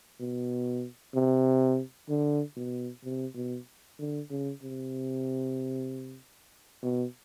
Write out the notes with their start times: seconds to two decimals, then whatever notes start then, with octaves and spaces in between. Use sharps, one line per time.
0.20 B2
1.15 C3
2.09 D3
2.57 B2
3.04 C3
3.36 B2
3.99 D3
4.30 C#3
4.63 C3
6.83 B2